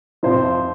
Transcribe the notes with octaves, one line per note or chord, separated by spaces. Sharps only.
F2 C3 F3 C5